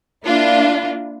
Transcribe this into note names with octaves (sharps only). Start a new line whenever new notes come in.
A#3 D4 E4 F4